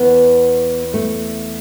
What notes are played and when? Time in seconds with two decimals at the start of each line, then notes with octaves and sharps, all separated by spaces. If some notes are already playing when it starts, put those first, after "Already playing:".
Already playing: E2 E3 B3
0.94 A3